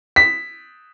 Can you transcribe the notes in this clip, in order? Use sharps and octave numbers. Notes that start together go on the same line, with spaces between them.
B6